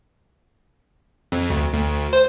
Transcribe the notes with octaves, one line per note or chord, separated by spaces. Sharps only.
F2
D2
D2
C5